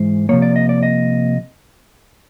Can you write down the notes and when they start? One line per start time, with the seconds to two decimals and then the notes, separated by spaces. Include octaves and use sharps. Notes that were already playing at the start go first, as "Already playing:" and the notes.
Already playing: G#2 E3 G#3 C5
0.29 C3 F3 A#3 C#5
0.42 D5
0.56 D#5
0.69 D5
0.83 D#5